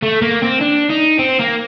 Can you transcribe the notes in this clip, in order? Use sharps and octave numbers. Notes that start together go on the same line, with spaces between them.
A3
A#3
C4
D4
D#4
C4
A#3